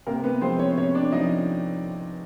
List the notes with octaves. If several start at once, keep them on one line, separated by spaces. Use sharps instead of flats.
C3 A#3 A#4
B3 B4
F3 G#3 C4 C5
C#4 C#5
C3 C#4 C#5
D4 D5
F3 D#4 D#5